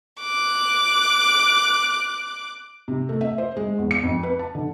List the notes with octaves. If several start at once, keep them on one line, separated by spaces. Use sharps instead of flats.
D6 F#6
C3
A3
E5
C5
G#3
E2
C#7
F2
B4
A5
D3